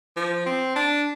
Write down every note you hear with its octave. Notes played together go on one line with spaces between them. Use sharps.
F3
C4
D4